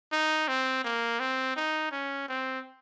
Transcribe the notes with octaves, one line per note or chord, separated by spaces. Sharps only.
D#4
C4
A#3
C4
D#4
C#4
C4